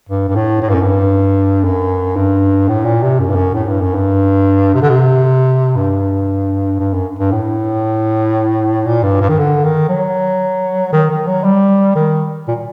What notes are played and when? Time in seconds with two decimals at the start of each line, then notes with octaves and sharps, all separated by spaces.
0.09 G2
0.29 G2
0.36 A2
0.62 A2
0.69 G2
0.75 F#2
0.83 G2
1.64 F#2
2.16 G2
2.68 A2
2.85 A#2
3.03 C3
3.19 F#2
3.29 G2
3.36 F#2
3.54 A2
3.67 G2
3.82 F#2
3.95 G2
4.74 C3
4.82 D3
4.89 C3
5.77 G2
6.80 G2
6.94 F#2
7.19 G2
7.32 A2
8.86 A#2
9.03 G2
9.21 G2
9.29 D#3
9.38 D3
9.64 D#3
9.89 F#3
10.93 D#3
11.10 D#3
11.27 F#3
11.44 G3
11.96 D#3
12.48 A#2